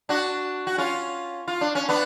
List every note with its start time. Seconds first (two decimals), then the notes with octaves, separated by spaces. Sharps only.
0.09 D4 F#4
0.67 F#4
0.78 C#4 F4
1.48 F4
1.61 D4
1.75 C#4
1.89 B3 D4